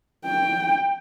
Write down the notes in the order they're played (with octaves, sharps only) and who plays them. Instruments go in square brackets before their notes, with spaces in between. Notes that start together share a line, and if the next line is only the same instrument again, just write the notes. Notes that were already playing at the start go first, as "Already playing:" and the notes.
[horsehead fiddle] G5